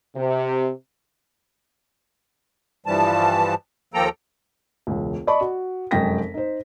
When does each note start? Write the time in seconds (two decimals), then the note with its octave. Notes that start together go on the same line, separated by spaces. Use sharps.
0.17 C3
2.86 G2 E3 F3 G3 A5
3.94 D#2 F3 A#3 A4 G5 A#5
4.87 E1 C#2
5.27 D5 D#5 A5 B5 C#6
5.41 F#4
5.91 F1 F#2 G#3 G5 A#6 B6
6.34 D#4 C5